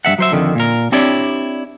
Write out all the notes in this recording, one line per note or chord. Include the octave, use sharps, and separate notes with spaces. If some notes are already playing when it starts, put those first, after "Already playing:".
G2 G#3 E5 F#5
F#3 C5 E5
F2 D3 D#3
A#2 A#4
C4 D4 E4 G4 C#5 D5